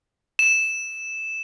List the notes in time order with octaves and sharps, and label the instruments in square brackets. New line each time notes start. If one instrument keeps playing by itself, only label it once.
[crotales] E7